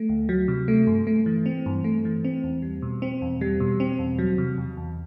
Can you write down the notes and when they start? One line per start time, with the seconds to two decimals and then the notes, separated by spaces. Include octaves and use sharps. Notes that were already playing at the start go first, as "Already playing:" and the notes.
Already playing: A3
0.09 D2
0.29 F#3
0.48 C3
0.68 A3
0.87 G2
1.07 A3
1.26 E3
1.46 C4
1.66 G2
1.84 A3
2.05 E3
2.25 C4
2.44 E2
2.62 G3
2.82 B2
3.02 C4
3.22 E2
3.41 G3
3.60 B2
3.80 C4
3.99 E2
4.19 F#3
4.38 C3
4.58 E2
4.77 E2